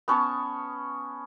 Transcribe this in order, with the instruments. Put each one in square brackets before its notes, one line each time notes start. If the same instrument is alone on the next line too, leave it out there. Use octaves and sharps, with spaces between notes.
[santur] B3 C#4 A5 C#6